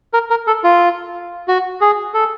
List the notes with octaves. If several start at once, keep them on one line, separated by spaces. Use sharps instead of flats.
A#4
A#4
A4
F4
F#4
G#4
A4